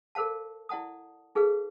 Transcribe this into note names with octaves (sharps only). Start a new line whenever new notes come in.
A4 A#4 C5 F5 A5
E4 D5 F#5 A5 D#6
D#4 G#4 A4 B4 F5